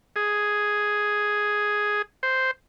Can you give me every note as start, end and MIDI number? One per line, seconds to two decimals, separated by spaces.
0.16 2.02 68
2.23 2.51 72